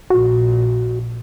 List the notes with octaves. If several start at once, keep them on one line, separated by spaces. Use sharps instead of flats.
A#1 A#2 F#4